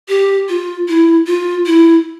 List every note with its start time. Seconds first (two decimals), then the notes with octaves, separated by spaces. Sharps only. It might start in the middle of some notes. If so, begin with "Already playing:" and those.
0.09 G4
0.49 F4
0.88 E4
1.27 F4
1.66 E4